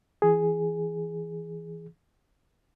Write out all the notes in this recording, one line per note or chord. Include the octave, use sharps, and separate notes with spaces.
E3 G#4